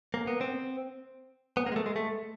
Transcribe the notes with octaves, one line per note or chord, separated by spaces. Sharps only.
A#3
B3
C4
B3
A#3
G#3
A3
G#3
A3